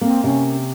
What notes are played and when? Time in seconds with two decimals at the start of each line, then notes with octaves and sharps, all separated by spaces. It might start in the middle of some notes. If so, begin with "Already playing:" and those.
0.01 A#3 C4
0.23 C3 C#4